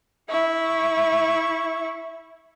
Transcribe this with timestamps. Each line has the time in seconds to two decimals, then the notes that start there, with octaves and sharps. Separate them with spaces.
0.29 E4 C#6